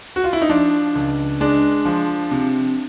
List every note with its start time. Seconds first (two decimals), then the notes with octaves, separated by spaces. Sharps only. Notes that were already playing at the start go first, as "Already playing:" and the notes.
0.16 F#4
0.24 F4
0.33 E4
0.42 D#4
0.49 F3 D4
0.95 C#2
1.40 G#3 D4
1.85 F3
2.31 C3